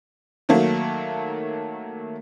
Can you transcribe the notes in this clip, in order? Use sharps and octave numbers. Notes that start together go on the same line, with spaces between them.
D#3 F#3 A3 A#3